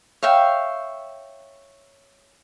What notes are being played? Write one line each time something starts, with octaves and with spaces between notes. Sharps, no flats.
C#5 E5 F5 G5